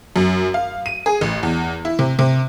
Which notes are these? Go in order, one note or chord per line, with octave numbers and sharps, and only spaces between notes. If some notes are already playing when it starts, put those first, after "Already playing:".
F#2
F5
D#7
G#4
A1
E2
E4
C3
C3